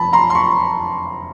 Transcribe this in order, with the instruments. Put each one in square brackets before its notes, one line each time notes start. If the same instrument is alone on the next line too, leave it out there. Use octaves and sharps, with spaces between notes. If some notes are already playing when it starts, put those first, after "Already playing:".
Already playing: [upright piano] F1 F2 A5 B5
A#5 C6
C6
B5 C#6